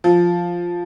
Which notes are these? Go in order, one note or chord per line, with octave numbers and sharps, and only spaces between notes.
F3